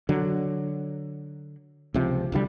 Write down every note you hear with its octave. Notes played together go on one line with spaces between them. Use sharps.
D3 F#3
C#2 C3 F3
C2 D3 E3 G3